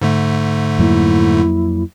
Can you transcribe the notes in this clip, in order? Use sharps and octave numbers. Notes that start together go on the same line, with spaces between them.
G#2 D3 A3
F2 F#3 A#3 E4